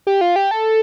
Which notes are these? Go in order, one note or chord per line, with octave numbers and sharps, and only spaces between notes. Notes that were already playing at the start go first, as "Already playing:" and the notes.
G4
F4
G4
A4